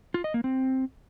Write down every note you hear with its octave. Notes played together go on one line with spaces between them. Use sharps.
F4
D#5
A#3
C4